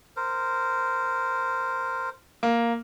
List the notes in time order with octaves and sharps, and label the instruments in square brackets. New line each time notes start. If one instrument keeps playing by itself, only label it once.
[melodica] A#4 C5
[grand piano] A#3